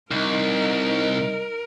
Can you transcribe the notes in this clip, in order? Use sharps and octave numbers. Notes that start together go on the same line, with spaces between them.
C2 D#4 A#4